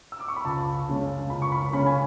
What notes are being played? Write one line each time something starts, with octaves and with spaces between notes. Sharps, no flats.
E6
D6
C#6
B5
C#2 A5
C#3 G#3 C#4
C#2 B5
C#6
B5
C#3 G#3 C#4 B5
G#5